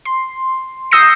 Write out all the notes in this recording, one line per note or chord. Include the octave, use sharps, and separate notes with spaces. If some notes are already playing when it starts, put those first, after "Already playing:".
C6
D#6 E6 G6 A#6 C7 C#7